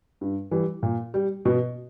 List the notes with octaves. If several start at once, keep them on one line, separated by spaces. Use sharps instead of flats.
G2
E3 G3
A#2
G3
B2